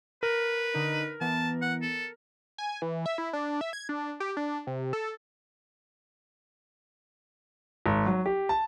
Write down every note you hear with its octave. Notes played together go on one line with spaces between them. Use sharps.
A#4 B4
D3 D#4
E3 B3 A5
F#5
A4
G#5
E3
E5
E4
D4
E5
G#6
D4
G4
D4
C3
A4
G#1
F#3
G4
A5